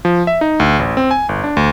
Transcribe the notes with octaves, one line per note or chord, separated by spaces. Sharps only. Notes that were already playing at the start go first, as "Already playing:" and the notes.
F3
E5
D#4
D2
A1
C4
G#5
G1
D4
D2